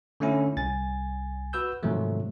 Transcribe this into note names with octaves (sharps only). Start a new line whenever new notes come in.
D3 A3 C#4 E4
C2 G#5 A6
F#4 B4 E6 G6
G#2 C3 D#3 F3 F#3 A3